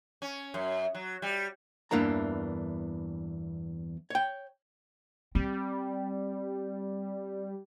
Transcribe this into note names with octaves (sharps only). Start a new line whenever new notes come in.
C#4
F#2
F#3
G3
E2 G2 E3 A#3 D4 A#5
C#5 G5
G3 C4